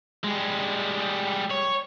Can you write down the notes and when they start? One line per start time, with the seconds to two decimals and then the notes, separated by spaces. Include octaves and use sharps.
0.24 G3 G#3
1.51 C#5